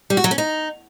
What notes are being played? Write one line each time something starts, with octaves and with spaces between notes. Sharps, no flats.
G3
F#4
F#3
C#4
D#4